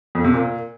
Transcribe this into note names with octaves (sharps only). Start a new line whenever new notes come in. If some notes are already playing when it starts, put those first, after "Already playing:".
F2
C3
A#2